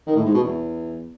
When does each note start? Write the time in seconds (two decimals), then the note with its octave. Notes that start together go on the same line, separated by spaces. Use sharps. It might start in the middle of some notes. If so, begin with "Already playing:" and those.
0.06 D#3
0.16 A2
0.25 G#2
0.34 B2
0.44 E2